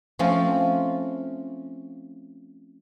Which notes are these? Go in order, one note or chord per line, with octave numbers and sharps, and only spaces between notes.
F3 A3 C4 C#4 F4